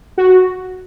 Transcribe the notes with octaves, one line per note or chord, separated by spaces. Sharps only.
F#4